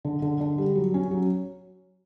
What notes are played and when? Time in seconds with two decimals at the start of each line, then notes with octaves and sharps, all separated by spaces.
0.05 D3
0.22 D3
0.41 D3
0.58 G3
0.75 F#3
0.94 C#4
1.11 F#3